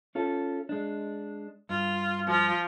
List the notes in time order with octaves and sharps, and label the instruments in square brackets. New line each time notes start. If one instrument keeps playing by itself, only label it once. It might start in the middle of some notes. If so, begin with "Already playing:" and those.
[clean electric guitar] C#4 F4 A4
G#3 D4
[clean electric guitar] G2 [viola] F4
[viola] F3 F4